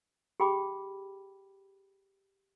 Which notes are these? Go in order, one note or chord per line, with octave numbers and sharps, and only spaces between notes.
G4 G#4 G5 B5 D6